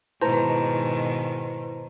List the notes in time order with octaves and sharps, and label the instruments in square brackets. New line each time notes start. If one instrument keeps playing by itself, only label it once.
[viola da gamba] G#2 B2 D#3 [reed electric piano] E4 B4 A5 [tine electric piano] C5 A#5